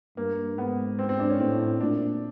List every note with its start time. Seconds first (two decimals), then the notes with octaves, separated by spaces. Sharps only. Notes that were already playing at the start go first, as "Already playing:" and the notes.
0.17 G2 A#3
0.58 G#2 B3
0.99 C4
1.09 C4
1.19 D4
1.30 C#4
1.39 A2 C4
1.81 A#2 D4